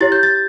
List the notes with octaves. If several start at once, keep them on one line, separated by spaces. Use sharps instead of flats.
E4 G4 C#5 A6
G6
A6